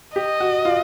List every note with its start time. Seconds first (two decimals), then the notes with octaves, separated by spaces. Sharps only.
0.16 G4 D#5
0.40 F#4
0.65 F4